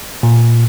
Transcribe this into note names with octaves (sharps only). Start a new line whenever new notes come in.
A#2